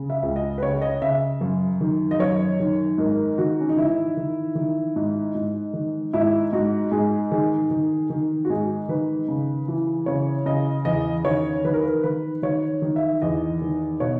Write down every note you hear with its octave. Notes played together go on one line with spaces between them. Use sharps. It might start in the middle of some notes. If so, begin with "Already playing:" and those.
Already playing: C#3
E5
C#2
D#5
B4
C#3 C#5
D#5
C#3 E5
F#2
D#3
D#5
F#2 C#5
D#3
G#2 A#4
D#3 F#4
C#4
D#4
D#3 E4
D#3
D#3
G#2
G#2
D#3
G#2 E4
G#2 F#4
G#2 G#4
D#3 G#4
D#3
D#3
F#4
G#2 G#4
D#3 B4
C#3
E3
C#3 C#5
C#3 D#5
E2 D#5
D#3 C#5
D#3 B4
A#4
B4
D#3 B4
D#3 C#5
D#3
E5
E2 D#5
D#3
B2 C#5